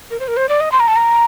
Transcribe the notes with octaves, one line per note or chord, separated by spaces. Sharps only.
A#4
C5
A#4
C5
D5
D#5
C6
A#5
A5
A#5